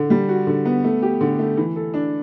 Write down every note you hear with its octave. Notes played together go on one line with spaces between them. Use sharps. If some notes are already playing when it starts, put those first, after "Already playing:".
Already playing: D3
G3
F#4
D3
B3
A3
G4
D3
A3
E3
A4
D4